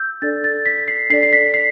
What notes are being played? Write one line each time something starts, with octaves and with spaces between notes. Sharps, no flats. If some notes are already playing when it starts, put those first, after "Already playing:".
Already playing: E6 G6
D4 A4 D5 A6
A6
B6
C7
D4 A4 D5 C7
C7
B6
C7